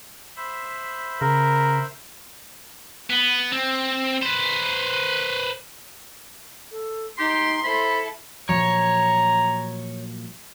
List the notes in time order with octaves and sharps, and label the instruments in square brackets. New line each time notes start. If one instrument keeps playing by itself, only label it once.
[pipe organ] C5 E5 B5
[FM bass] C#3 [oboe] A#4
[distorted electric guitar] B3
C4
B4 C5
[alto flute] A4
[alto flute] D#4 [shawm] G4 [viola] C6
[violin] E4 A4 [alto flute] C5 [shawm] B5
[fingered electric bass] A#2 F3 F#3 [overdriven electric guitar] C#5 [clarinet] A#5